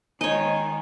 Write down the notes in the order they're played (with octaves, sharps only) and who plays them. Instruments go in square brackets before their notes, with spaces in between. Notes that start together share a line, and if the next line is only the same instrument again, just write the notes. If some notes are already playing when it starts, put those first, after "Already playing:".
[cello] D#3 G#3 [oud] D#4 [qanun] C#5 D#5 [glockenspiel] G#5 A#5